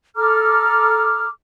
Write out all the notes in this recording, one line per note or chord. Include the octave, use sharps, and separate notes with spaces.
A4 A#5 D6 F6